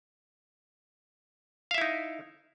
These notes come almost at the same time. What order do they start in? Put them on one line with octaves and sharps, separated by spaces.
F5 E5 E4 D#4